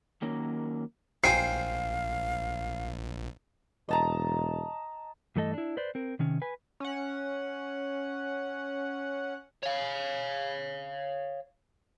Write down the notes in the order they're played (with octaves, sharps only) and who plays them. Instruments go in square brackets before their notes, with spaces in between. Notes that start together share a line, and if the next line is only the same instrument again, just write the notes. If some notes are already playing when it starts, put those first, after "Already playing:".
[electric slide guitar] D#3 F#3 A#3 C#4 A#4
[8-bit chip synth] A#1 [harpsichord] C5 G5 G#5 [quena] F5 [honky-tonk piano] C7
[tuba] E1 [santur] D#5 A5 A#5
[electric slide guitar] G2 E3 A3 A4 D#5
D4 E4
B4 C5 D5
C4 A#4
C3 D#3 C#4
B4 G#5
[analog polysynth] C#4 F#5
[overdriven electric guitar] C#5 F5